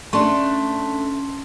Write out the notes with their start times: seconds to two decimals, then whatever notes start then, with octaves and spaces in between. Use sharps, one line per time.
0.13 A3 C#4 D4 A5 C6 C#6